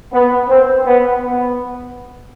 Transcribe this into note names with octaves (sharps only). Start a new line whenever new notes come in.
B3
C4
B3
B3